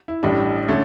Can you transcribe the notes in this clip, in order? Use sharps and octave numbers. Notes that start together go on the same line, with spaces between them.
E4
A1 A2 G3 D4
D3 A3 C#4